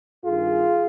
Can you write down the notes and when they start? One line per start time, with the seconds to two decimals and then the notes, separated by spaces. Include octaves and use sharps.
0.25 G2 D#3 F4 G#4